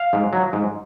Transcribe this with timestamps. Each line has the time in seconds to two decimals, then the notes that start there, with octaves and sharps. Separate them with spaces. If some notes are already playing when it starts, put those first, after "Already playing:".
Already playing: F5
0.13 G#2
0.33 F#3
0.53 G#2